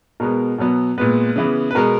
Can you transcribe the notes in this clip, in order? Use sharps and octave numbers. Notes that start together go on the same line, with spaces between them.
B2 G#3 B3 A#4
B2 F#3 B3
A#2 G#3 B3 B4
C#3 E3 B3
B4
B2 G#3 B3 A#4